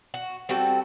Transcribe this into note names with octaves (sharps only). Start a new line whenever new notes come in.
F#4
G3 C4 F#4 A4